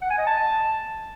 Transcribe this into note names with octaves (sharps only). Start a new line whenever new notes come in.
F#5
G#5
D#5
A5